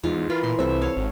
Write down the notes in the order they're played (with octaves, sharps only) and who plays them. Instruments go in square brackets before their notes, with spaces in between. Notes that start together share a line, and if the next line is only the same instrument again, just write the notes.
[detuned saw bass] E2 [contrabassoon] G#2 [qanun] F4
[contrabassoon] E3 [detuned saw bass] F4 [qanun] A#4 B5
[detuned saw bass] A#2 [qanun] C6
[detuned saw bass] C2 [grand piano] C4 [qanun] A4 E5
[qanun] C#5 F5
[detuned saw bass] G#1